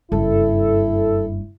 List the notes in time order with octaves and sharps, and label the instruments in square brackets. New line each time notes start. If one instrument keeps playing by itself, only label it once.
[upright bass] F#1 G2 [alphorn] E4 [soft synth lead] A4